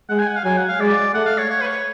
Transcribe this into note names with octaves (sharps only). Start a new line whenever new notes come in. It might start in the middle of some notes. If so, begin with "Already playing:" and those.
G#3 F#5
G#5
F#5
F5
F#3 G#5
F#5
F5
G#3 D5
A3 F#5
F5
C#5
C#5
B4
C#5